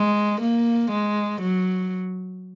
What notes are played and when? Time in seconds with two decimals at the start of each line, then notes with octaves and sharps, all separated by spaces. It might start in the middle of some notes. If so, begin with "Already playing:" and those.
Already playing: G#3
0.41 A#3
0.91 G#3
1.41 F#3